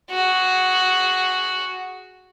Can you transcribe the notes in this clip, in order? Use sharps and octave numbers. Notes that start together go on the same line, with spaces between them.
F#4 G#4